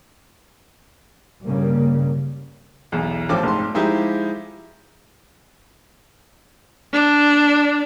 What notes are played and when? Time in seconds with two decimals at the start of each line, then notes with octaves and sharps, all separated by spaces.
1.45 G2 C#3 G3 A#3
2.92 B1 E2
3.29 A1 F3 A4 D6
3.43 F1 G#2 C6
3.74 F3 G#3 D#4 E4 G4
6.93 D4